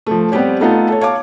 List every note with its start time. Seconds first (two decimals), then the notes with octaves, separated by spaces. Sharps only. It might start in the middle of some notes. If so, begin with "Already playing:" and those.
0.07 F3 A3
0.32 G3 B3 C4 G4 C#5
0.60 A3 B3 D#4 F4 A4
0.88 A4 C#5
1.01 C#5 F5 A5 D6